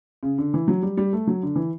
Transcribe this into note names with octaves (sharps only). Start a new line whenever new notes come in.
C#3
D3
E3
F#3
G3
G3
A3
F#3
D3
E3